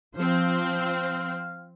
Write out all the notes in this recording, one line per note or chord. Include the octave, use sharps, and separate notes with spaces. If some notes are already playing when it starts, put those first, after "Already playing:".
F3 C4 C5 F5